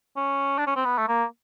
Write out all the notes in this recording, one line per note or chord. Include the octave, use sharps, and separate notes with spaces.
C#4
D4
C#4
C4
B3
A3
A#3